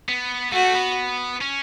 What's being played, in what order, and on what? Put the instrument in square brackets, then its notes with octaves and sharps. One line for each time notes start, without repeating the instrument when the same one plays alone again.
[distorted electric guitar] B3
[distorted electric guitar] A3 [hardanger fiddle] F#4
[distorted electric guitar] B3
C#4